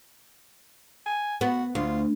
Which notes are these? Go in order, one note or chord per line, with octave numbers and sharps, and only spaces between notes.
G#5
B3 F#4
D2 F4